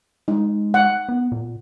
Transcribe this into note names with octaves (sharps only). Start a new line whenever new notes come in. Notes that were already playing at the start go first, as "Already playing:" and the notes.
G#3 D#4
F#5
B3
A#2